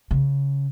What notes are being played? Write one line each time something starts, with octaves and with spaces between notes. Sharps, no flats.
C#3